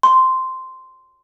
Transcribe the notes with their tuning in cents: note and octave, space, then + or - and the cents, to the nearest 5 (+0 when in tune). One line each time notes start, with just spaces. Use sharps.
C6 -10